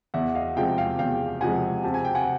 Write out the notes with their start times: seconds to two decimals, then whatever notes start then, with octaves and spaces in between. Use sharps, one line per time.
0.14 E2 E5 F#5
0.35 D#5 F5
0.56 C3 F3 G#3 F5 G5
0.78 F5 G5
0.99 E2 F5 G5
1.41 C3 F3 G#3 F#5 G#5
1.83 C3 A5
1.94 G#5
2.05 G5
2.15 F#5 G#5